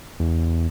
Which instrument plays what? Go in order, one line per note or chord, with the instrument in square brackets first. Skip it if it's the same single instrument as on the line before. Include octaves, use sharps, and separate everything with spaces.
[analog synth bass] E2